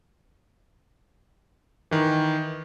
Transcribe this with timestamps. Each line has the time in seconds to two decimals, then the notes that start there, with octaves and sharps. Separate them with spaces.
1.91 D#3 E3